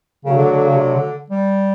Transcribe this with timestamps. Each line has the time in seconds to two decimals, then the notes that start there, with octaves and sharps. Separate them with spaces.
0.25 C#3 F#3 A3 D4 F#4
0.38 D3
0.52 D3
0.65 C#3
0.77 C3
0.95 D3
1.30 G3